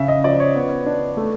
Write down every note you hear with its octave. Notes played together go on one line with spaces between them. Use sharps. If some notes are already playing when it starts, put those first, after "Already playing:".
Already playing: C#3 E5
D#5
F3 D5
C#5
B3
D4
A3